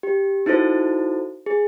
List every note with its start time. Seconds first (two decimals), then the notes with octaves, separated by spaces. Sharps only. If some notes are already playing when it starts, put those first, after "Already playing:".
0.03 G4
0.46 D#4 E4 F#4 A4 C5
1.46 G#4